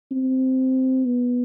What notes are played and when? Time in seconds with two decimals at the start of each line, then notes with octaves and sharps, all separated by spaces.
0.11 C4
1.05 B3